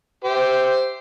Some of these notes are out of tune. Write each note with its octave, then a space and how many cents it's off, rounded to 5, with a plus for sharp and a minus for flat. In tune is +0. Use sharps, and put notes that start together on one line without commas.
G4 +0 C5 -10 E5 +0